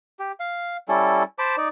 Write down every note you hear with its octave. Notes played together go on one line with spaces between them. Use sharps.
G4
F5
G3 C#4 E4 A4
C5 A5 B5 D6
D#4 D5